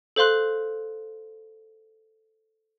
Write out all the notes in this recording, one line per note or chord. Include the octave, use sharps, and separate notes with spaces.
A4 C5 F5 C6 F#6